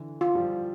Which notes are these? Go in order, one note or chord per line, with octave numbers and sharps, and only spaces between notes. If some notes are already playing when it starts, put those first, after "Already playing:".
Already playing: D3 E3
F4
F3 G3